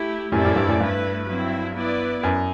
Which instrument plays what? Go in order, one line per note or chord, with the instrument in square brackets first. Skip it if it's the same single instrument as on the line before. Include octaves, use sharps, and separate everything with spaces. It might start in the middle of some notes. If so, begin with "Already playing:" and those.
Already playing: [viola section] A3 E4 G4
[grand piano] F#2 A2 [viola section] G3 C4 E4 A4 D5
[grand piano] F#2 A2
G2
F#2 A2
[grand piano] G2 [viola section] A3 E4 B4
[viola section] F#3 C4 E4
B3 E4 B4 D5
[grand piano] F#2